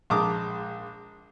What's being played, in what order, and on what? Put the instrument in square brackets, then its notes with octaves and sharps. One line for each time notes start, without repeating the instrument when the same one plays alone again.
[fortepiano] A#1 G#3 A5 A#5 D6 D#6